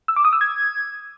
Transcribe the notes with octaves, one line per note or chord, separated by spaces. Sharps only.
E6
D6
D#6
E6
G#6